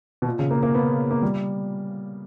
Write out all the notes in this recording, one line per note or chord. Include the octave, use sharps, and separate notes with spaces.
B2
A#2
C#3
A#3
A#3
B3
A#3
G3